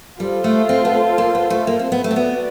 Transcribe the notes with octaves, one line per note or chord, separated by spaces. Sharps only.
G3 F4 A4 C5
A3
C4
B3
A#3
B3
A3
A#3
C4
B3
A3
C4
B3 F#4 B4 D5